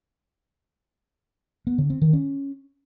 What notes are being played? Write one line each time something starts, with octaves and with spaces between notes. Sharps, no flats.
B3
D3
C4
D#3
C#4